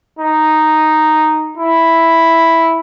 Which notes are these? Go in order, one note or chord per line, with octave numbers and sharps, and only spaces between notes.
D#4
E4